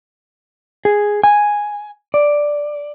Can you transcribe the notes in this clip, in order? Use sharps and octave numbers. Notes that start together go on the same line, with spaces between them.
G#4
G#5
D5